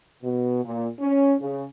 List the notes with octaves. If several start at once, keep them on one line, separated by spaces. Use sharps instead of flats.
B2
A#2
C#4
C#3